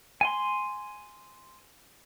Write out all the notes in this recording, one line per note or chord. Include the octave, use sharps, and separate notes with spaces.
G#5 C6